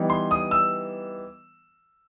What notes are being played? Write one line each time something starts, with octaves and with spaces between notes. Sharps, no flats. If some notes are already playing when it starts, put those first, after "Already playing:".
Already playing: E3 G3 B3 D#4
C6
D#6
E6